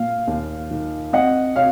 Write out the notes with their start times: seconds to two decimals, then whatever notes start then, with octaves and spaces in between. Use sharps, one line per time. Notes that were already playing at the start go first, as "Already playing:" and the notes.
Already playing: A#2 A#3 F5
0.27 D#2
0.71 D#3
1.13 C4 D#5 F#5
1.55 C3 C#5 F5